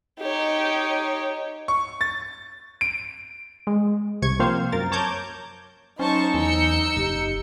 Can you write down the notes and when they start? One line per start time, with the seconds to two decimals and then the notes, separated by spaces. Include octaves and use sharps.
0.19 D#4 G4 C#5
1.68 C#6
2.01 A6
2.81 D7
3.67 G#3
4.22 C2 C3 C#6 G#6
4.39 F3 A#3 C4 C5 F5
4.72 F#2 A#4 A6
4.92 C#5 A5 A#5 D6 G6 G#6
5.99 F#3 C#4 D#4 C5 A5 C#6
6.34 E2 G#5 E6 G6 C#7
6.97 F#1 G4